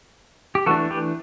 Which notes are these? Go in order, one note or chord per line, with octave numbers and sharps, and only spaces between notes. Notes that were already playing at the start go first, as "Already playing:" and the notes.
G4
E3 A3 D4 F#4 A4
G4 B4